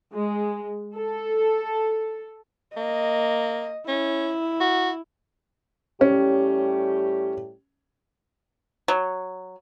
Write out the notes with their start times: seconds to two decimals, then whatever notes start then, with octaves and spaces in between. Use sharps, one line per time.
0.13 G#3
0.94 A4
2.77 A#3 D#5
3.88 C#4 E4
4.61 F#4
6.01 A2 G3 C#4 G4
8.88 F#3